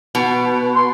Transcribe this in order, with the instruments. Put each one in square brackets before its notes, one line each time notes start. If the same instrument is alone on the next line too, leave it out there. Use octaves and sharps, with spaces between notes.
[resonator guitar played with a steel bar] B2
[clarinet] C6